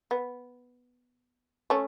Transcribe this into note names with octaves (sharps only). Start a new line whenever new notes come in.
B3
A3 C#4